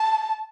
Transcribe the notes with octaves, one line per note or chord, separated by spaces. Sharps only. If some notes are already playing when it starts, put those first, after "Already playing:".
Already playing: A5